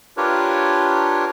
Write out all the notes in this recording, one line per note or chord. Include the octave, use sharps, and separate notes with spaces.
D4 F4 G4 A#4 B4 C#5